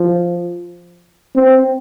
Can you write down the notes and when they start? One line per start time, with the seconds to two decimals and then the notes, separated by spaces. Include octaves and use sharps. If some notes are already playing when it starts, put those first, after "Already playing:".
Already playing: F3
1.36 C4